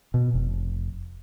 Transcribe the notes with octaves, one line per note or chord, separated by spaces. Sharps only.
B2
F1